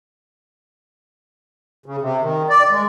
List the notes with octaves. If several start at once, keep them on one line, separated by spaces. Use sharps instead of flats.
C#3
C3
D#3
D5
G#3